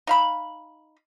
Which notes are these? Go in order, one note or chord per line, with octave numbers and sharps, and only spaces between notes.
D#4 F5 B5